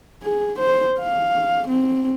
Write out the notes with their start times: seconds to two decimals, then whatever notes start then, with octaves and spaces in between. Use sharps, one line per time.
0.23 G#4
0.59 C5
1.00 F5
1.68 C4